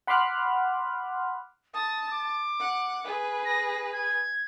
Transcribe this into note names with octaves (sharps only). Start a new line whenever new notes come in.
F#5 B5 C6 D6 F6 F#6
A5 D#6
D6
F#5
G#4 B4
A#6
G#6